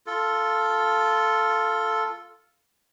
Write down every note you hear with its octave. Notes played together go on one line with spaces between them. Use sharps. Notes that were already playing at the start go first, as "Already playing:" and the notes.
F4 A4